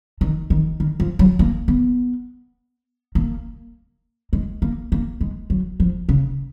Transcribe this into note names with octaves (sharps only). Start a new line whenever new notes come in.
D#3
D#3
D#3
F3
F#3
A#3
B3
A#3
G#3
A#3
A#3
G#3
F#3
F3
C#3